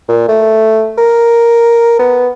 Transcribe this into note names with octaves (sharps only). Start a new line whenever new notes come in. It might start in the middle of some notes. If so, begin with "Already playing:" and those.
A#2
A3
A#4
B3